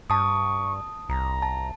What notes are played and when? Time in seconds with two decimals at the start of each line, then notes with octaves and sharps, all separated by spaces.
0.10 G2 A5 C#6 D#6
1.09 C2 A#5
1.42 A5